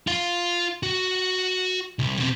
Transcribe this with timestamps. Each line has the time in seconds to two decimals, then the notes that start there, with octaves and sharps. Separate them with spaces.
0.07 F4 F5
0.83 F#4
1.99 C2
2.19 B2 C4